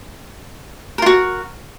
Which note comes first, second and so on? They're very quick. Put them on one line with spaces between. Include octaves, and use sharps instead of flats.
A#4 F4 F#4